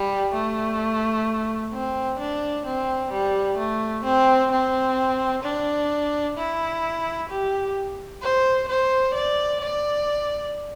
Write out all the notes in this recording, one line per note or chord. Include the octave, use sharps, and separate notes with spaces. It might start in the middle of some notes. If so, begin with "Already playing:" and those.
Already playing: G3
A3
C4
D4
C4
G3
A3
C4
C4
D4
E4
G4
C5
C5
D5
D5